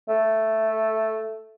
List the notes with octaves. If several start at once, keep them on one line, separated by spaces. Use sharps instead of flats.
A3